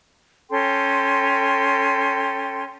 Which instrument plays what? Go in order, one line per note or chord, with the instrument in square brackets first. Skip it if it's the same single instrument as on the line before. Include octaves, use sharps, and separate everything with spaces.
[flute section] C#4 A4 G5 C6